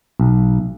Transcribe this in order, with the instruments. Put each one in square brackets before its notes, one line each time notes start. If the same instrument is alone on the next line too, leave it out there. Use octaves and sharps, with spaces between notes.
[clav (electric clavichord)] B1